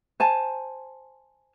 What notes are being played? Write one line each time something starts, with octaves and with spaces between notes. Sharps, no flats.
C5 G#5 A5